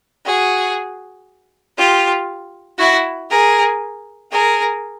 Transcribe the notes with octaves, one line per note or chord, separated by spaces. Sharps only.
F#4 G#4
F4 G4
E4 F#4
G#4 A#4
G#4 A#4